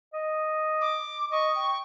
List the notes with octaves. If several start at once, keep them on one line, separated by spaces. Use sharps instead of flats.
D#5
D6
D#5 C#6
G5